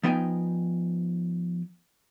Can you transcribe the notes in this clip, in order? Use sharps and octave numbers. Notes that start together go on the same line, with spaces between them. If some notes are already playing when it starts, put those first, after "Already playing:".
F3 B3 D#4 G5 G#5